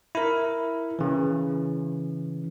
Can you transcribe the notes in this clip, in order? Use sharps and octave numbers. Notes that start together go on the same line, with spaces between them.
E4 A#4
C#3 E3